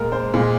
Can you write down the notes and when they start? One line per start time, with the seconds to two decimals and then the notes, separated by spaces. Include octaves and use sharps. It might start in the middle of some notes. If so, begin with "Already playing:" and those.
Already playing: A#2 G#3 A#4
0.12 C5
0.34 A#2 G#3 G#4